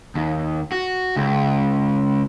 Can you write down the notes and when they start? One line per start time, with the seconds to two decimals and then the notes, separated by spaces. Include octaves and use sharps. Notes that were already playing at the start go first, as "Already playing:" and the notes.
0.15 D#2
0.72 F#4
1.16 C#2